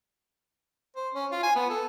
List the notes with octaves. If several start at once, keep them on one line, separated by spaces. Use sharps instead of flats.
C5
C#4
F4
G#5
B3
A4